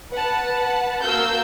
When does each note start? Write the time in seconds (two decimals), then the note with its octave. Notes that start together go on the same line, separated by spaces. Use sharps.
0.12 B4 F#5 A5
1.03 A#3 F#4 A#4 F5 E6 G6